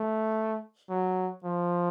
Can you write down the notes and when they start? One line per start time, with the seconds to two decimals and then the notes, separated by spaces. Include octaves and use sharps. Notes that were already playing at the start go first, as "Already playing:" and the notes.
Already playing: A3
0.90 F#3
1.44 F3